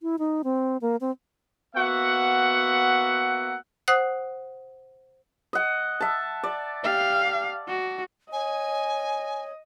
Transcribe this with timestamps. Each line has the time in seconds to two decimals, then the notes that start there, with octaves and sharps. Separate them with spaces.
0.02 E4
0.19 D#4
0.44 C4
0.82 A#3
1.01 C4
1.76 A#3 B3 F#4 E5 F#5
3.88 C5 F#5 D#6 F#6
5.53 D#5 F#5
6.01 E5 A5
6.43 D5
6.84 G4 F5
7.68 F#4
8.32 C#5 D#5 G#5